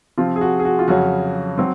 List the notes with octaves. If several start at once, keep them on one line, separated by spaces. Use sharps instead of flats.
C3 F3 C4 F4
G#4
F#4
G#4
F#4
F4
F2 C#3 F#3 C#4 F#4
F#3 C4